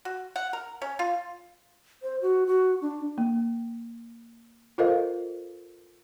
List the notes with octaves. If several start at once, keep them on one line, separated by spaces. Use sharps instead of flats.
F#4
F#5
A#4
C#4
F4
C5
F#4
F#4
D4
A#3
F4 A4 A#4 C5 D#5 F5